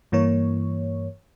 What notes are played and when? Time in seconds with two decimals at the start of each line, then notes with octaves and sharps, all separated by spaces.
0.12 G2 E3 A#3 C#5